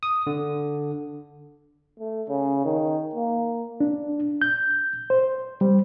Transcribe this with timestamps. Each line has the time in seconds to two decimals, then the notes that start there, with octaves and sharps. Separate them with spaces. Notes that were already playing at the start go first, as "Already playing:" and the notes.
0.03 D#6
0.27 D3
2.00 A3
2.29 C#3
2.65 D#3
3.15 A#3
3.80 D4
4.42 G6
5.10 C5
5.61 G3